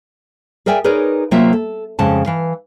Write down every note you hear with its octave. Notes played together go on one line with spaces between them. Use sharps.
G#4 A#4 D5 E5 G5 G#5
D#4 G#4 A#4 B4 C#5 D5
C3 F#3 A#3 F4 E5
A4
F2 C#3 G#3 A5
E3 F5